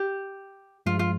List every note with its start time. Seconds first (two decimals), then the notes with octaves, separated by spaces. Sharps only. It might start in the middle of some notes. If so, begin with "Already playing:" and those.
Already playing: G4
0.86 G2 F3 G#3 F4
0.99 F4